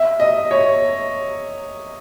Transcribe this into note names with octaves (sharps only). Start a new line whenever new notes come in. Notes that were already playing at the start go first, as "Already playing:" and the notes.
Already playing: E5
D#5
C#5